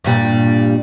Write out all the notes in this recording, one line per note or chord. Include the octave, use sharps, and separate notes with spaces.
G2 A#2 G3